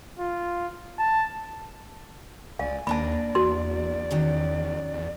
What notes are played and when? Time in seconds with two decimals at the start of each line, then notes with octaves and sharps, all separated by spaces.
0.19 F4
0.99 A5
2.59 C#2 D5 F5 G#5
2.87 D#2 A#3 D4 A#4 D5 A5 B5
3.35 E2 F#4 C6
4.11 E2 D#3 F#3 C#4
4.93 E2